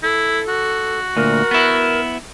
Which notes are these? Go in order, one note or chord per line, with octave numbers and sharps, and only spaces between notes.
E4 A4
F#4
D2 A#2 A#4
B3 E4